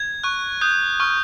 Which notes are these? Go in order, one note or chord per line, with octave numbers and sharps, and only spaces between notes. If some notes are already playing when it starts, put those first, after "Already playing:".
Already playing: G#6
C#6 F#6
D#6 F#6 G6
C#6 F6